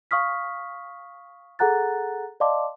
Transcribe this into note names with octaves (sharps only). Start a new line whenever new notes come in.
F5 C#6 D#6 F6 B6
G#4 A4 F#5 A#5 F#6 A6
D5 D#5 F5 A5 C6 D6